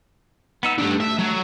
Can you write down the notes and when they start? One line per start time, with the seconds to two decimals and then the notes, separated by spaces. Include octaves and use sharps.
0.63 B3 D#4 E6
0.78 A3 D4 G4
1.00 E5
1.19 F#3